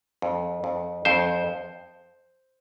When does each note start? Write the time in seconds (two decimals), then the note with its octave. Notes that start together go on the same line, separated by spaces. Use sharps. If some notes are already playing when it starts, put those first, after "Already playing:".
0.22 F2
0.64 F2
1.05 F2 C5